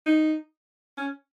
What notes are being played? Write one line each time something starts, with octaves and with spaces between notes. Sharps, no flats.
D#4
C#4